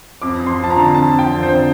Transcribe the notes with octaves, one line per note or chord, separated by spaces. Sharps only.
F2 D6
F2
C6
F3 A5
A#5
D3
F2 A5
F2
G5
F3
C5
D3